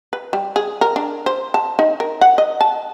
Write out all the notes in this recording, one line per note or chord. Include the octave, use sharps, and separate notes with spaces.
B4
G3
G#4
A#4
D4
C5
A5
D#4
A#4
F#5
D#5
A5